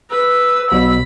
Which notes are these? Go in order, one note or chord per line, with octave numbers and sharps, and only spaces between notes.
B4 E6
B1 B2 B5